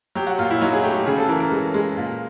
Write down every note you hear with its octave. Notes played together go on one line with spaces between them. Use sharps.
F#3 G4
F#4
A#2 F4
E4
F#3 D#4
G#4
A3 G4
G4
C#3 G#4
A4
E3 A#4
A#4
G#3
G#3
A#2